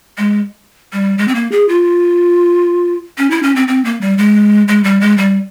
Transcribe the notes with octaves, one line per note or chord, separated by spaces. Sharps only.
G#3
G3
G#3
C4
A#3
G#4
F4
C#4
E4
C#4
C4
C4
A#3
G3
G#3
G#3
G3
G#3
G3